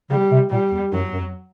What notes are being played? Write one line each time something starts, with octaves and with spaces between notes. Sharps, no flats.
C#3 G3
C3
A#2 G3
E2
F#2 F#3
F#2
F2